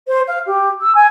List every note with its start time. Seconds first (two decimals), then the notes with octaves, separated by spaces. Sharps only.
0.07 C5
0.27 F5
0.46 G4
0.81 E6
0.95 G#5